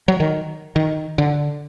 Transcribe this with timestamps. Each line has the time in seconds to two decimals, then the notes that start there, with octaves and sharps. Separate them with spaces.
0.08 F#3
0.20 D#3
0.76 D#3
1.18 D3